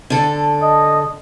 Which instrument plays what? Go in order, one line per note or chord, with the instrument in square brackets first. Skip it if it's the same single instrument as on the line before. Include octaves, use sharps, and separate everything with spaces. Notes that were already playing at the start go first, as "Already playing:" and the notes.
[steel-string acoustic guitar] D3 A4
[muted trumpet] D#5